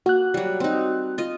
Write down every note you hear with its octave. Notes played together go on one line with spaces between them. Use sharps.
A#3 F#4 F#6
F#3 G3
C4 D#4
F4 D#5